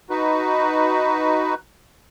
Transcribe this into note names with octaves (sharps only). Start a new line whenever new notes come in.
D#4 F#4 B4